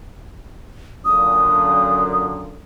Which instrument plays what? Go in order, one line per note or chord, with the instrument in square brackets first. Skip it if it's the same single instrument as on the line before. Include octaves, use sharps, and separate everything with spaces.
[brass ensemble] F#2 A#2 D3 [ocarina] D#6